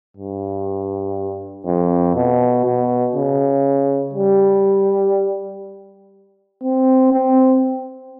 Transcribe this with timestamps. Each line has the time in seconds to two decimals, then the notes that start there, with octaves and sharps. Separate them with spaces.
0.17 G2
1.66 F2
2.15 B2
2.65 B2
3.16 C#3
4.14 G3
6.63 C4
7.13 C4